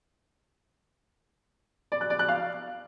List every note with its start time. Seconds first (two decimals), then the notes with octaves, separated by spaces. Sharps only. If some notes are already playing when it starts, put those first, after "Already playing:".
1.92 D5
2.01 F#6
2.10 D5
2.19 F#6
2.29 F5